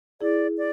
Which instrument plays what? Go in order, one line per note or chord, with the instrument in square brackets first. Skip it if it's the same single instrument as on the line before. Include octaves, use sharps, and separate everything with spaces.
[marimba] E4 G#4 [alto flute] D5
[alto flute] D5